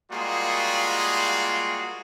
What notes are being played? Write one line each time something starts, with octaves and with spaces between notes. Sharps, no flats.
G3 G#3 A#3 F4 F#4 G#4